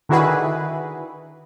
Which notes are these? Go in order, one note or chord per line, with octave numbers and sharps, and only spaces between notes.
D3 D#3 E4 F#4 G#4 B4